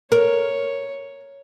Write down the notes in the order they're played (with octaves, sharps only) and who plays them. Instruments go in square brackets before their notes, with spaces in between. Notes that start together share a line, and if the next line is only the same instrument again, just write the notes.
[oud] A#4 [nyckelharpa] C#5